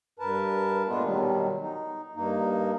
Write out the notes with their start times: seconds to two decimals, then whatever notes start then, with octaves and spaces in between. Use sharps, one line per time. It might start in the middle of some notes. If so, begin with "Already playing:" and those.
0.19 G2 A#4 B4 A5
0.88 A#2 G#3 A3 B3 D4 F4
1.04 B2 D#3 F#3 G3
1.62 D#4
2.15 G2 A#3 D#4